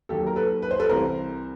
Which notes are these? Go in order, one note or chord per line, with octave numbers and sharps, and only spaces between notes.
D#2 D#3 F#3 G4 A4
A#4
A4 B4
B4
C5
A4 B4
C2 C3 E3 A#4 C5